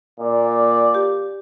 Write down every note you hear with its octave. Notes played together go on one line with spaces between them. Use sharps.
A#2 D5
G4